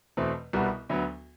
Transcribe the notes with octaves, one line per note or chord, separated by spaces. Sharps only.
E2 B2 A3 C4
C2 B2 G3 B3 F#4
D2 D3 F#3 B3